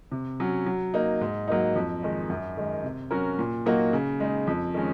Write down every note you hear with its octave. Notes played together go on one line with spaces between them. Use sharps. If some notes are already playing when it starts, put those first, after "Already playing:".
C3
F#3 C#4
F#3
A#3 D#4
G#2
F#3 A#3 D#4
F2
D#3 G#3 D#4
F#2
D#3 G#3
C3
F#3 C#4 F#4 A#4
A#2
F#3 A#3 D#4 F#4
C#3
G#3 D#4
F2
D#3 G#3 C#4